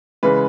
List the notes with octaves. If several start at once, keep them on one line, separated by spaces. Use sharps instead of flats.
C#3 E3 G#3 B4